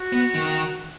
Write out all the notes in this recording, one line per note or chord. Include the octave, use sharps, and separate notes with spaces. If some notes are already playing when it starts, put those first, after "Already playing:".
Already playing: F#4
B3
D#3